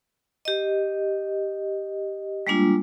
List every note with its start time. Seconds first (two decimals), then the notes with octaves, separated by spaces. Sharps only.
0.45 G4 D#5
2.47 G3 G#3 A#3 D4 F4